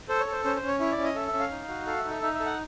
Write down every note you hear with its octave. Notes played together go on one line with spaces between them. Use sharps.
A4 C5
C#5
A4
C5
C#4 C5
C5
C#4
C#5
E4 C#5
D5
C#4
D#5
A4 E5
E5
C#4
F5
D#4
F#4
A4 F5
E5
D#4
E5
D#4 E5
E5
A4
F#5